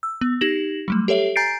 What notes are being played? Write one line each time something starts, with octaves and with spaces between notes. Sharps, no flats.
E6
B3
D#4 G4 A#6 E7 F#7
F#3 G3 A3
G4 A4 C#5 E5
G#5 A#5 G6 A6 C7 D7